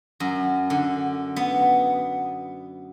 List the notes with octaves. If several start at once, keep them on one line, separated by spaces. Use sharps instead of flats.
F#2
D3
B3